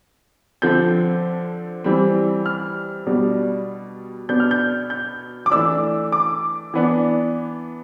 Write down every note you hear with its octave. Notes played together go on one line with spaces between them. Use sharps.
D3 F3 C4 G6
E3 G3 C4
F6
B2 G3 D4
B2 B3 D4 G6
F6
G6
G6
D6
E3 A3 D4 E6
D6
E3 B3 D4